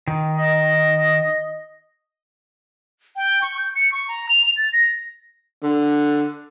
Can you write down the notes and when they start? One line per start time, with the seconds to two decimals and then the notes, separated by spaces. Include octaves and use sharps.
0.08 D#3
0.38 D#5
3.16 G5
3.42 C#6
3.58 G6
3.76 C#7
3.92 C#6
4.08 A#5
4.29 F7
4.57 A6
4.73 A#6
5.62 D3